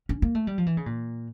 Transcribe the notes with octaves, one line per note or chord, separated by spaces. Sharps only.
C#4
A#3
A3
G3
F3
E3
C#3
A#2